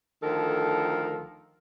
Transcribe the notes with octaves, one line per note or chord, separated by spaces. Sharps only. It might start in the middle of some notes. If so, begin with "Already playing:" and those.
D2 D#3 F3 A4 A#4